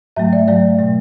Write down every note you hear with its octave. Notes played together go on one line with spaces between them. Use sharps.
G#2 F#3 A3 E5
D5
G#2 F#3 A3 D5
B2 A3